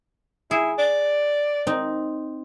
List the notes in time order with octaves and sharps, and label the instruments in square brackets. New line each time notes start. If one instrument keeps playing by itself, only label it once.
[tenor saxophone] E4 [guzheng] G#4
[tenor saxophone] D5
[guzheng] C4 D#4